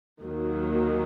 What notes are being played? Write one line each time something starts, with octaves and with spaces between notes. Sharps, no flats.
D#2 D#3 F#3 A#3